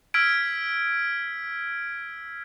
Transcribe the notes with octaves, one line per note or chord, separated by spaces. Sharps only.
E6 F6 G#6 B6 D7